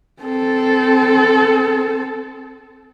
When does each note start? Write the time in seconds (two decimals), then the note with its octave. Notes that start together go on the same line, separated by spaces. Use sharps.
0.22 C4 A4